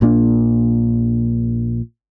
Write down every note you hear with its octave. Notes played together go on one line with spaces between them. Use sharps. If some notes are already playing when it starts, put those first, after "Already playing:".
A#1 A#2 A#3 D4